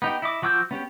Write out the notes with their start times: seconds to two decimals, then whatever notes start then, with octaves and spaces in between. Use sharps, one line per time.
0.02 B3 D#4 G4
0.22 E4 D#5 D6
0.42 F3 F#4 D6 E6 G6
0.71 B3 C#4 G4